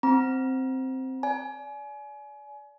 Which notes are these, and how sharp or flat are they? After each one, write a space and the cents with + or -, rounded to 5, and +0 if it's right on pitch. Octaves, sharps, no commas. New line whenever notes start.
C4 +0 A#5 +35
D5 -20 G#5 +30